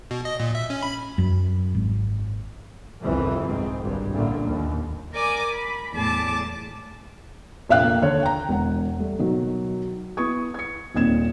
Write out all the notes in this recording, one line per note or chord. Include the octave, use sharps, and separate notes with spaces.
B2
D#5
A#2
E5
C#4
B5
F#2
G#1
G1 C2 F2 E3
G#2 C4
G#1 G2
A1 A#2 D3 A3 A#3
D#2
A#4 D5 G#5 D6 D#6
B5
E2 A2 A3 G#4 A5 D6
F1 A#1 E5 F5 G5 F#6
A#3
D#2 D3 C#5
G5 A#5
E1 F#5
G3 A3
B2 D#3 F#3
B3 E4 B4 C#6 D#6 G#6
G#6 C#7
D#1 A#2 C4 D#4 G#6 E7